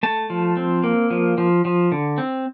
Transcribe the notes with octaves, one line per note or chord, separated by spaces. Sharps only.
A3 A5
F3
C4
A#3
F3
F3
F3
D3
C4